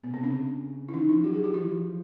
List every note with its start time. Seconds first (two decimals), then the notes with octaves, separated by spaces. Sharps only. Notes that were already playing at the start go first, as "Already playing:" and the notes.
0.03 B2 B3
0.13 C3 C4
0.23 C#3 C4 D4
0.89 E4
0.94 E3 C#4 D#4
1.09 F3 D4 E4
1.24 F#3 F4 G4
1.34 F#4 G#4
1.44 F4 G4
1.54 F3 E4 F#4
1.63 E3
1.71 F3